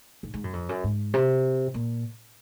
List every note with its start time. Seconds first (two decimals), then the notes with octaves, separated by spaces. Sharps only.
0.23 G#2
0.34 G#2
0.44 F#2
0.53 F2
0.69 F#2
0.84 G#2
1.14 C3
1.74 A#2